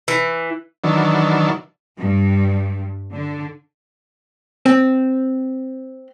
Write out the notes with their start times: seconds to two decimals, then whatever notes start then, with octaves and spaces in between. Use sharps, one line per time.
0.08 E3
0.84 D#3 E3 F#3 D4
1.97 G2
3.12 D3
4.66 C4